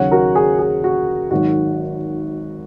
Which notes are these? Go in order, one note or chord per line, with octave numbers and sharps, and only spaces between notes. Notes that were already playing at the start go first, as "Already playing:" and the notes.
Already playing: D#2 C#3 F#3 C#5 F#5
F#4 A#4
G#4
G#4
F#4
G#1 D#3 F#3 F#4